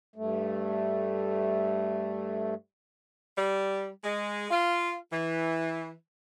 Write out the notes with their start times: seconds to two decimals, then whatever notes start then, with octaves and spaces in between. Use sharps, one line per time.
0.16 G2 A3
3.36 G3
4.04 G#3
4.50 F4
5.12 E3